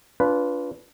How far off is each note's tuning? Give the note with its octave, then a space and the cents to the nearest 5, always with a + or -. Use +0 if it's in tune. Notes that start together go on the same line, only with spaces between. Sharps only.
D4 -30 F4 +0 B4 +0